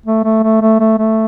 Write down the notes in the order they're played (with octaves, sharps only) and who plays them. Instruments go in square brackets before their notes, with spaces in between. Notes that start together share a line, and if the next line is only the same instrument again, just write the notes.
[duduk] A3
A3
A3
A3
A3
A3